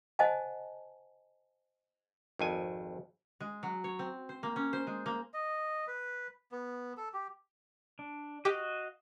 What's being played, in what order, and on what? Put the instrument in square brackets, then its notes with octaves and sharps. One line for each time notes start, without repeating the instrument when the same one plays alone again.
[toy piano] C5 D#5 F#5 G#5 A5
[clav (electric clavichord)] G#1 F2 G#5
[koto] G#3
F#3
C#5
C4
C5
A#3
C#4
C5
G#3
A#3
[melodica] D#5
B4
B3
A4
G4
[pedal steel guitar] D4
[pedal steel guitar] F#4 D#5 F5 [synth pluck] G4